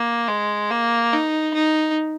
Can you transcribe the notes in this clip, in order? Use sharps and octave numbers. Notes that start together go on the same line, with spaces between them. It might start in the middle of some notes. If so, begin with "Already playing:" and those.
Already playing: A#3
G#3
A#3
D#4
D#4